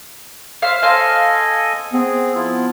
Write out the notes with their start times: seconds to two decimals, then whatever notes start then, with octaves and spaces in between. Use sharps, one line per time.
0.62 C5 E5 F5
0.83 A4 C5 D#5 F5 G#5
1.93 B3 C4 G#4
2.35 F3 E4 F4